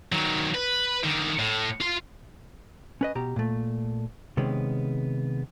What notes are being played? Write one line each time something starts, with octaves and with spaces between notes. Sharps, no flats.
D#3 F#3
B4
D3 D#3
A2
F4 C6
C#4 B4 D#5
B2 G4 A#5
A#2 A3
C3 D#3 G#3 B3 C#4